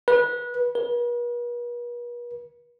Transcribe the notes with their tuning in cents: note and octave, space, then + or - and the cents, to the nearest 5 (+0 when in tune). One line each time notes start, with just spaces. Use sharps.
B4 -25
B4 -45